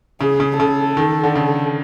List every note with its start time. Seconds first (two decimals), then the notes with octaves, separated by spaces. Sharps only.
0.21 C#3 G#4
0.40 C#3
0.60 C#3 A4
0.97 D#3
1.23 D3
1.36 C#3